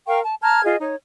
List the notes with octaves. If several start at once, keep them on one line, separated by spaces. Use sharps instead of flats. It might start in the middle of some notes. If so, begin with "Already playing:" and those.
A#4 F5 G5 C#6
A5
A5 A#5 F6 G#6
F4 G#4 D#5
D#4 C#5